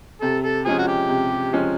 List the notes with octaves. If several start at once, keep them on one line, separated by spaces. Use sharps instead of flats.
C3 A4
A4
F3 G#3 C#4 G#4
F#4
G4
C3
F3 G#3 C#4